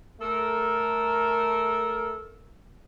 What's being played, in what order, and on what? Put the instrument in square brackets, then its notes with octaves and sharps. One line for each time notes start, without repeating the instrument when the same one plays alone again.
[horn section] A3 A4 A#4